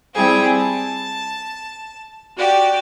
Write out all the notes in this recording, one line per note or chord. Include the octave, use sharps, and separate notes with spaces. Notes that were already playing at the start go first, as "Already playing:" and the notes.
G3 C4 E4 G4 G#4
A5
F#4 G4 D5